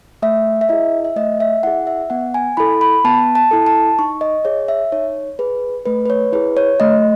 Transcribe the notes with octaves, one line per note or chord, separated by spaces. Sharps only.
A3 E5
E5
E4 G#4 D#5
E5
A3 D#5
E5
E4 G#4 F#5
E5
B3 F#5
G#5
E4 A4 B5
B5
B3 A5
A5
E4 A4
A5
D#4 C#6
D#5
G#4 C#5
E5
D#4 C#5
G#4 B4
A3 B4
B4
C#5
E4 G#4 B4
C#5
A3 D#5